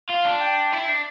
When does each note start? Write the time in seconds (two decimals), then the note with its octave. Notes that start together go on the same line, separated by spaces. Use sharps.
0.09 F4 F5
0.24 D4
0.40 G5
0.73 E4
0.89 D4